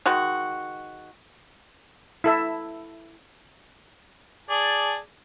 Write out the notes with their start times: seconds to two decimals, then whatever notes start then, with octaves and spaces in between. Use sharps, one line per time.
0.06 D#3 G#3 F#4
2.24 E4 A4 E5
4.50 G#4 D5 A5